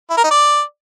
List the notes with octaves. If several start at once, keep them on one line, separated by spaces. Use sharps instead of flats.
E4
A#4
D#4
D5